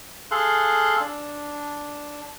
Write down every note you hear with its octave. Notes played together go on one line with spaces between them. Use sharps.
G#4 A4 F5 C6 F#6
D4